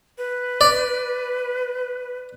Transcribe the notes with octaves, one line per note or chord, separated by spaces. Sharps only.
B4
D5